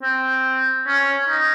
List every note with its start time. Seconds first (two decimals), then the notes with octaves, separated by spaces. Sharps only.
0.02 C4
0.87 C#4
1.29 D#4